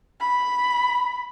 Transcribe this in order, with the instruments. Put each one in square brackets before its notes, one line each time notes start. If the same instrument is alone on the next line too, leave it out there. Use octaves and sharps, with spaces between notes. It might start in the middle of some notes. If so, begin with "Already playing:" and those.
[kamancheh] B5